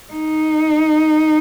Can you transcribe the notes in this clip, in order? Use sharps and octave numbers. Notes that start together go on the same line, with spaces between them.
D#4